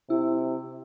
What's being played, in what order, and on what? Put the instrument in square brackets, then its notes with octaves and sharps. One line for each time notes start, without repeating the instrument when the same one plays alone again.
[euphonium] C3 [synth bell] E4